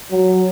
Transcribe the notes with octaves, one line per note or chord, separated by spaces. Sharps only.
F#3